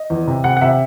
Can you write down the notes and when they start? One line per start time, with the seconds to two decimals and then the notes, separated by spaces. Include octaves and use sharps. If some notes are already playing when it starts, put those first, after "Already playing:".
Already playing: D#5
0.10 E2
0.27 C3
0.44 C3 F#5
0.57 F#5
0.61 C3 E5